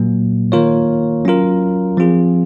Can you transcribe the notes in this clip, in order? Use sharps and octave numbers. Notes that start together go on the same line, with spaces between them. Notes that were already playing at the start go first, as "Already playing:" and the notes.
Already playing: A#2 F#3 A#3
D#3 A#3 F4 A#4 C#5
F#3 C#4 F4 A#4
F3 C4 F4 G#4